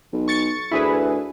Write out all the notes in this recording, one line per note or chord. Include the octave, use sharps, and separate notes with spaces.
B1
C#6 A6 C#7
D2 E4 G#4 B4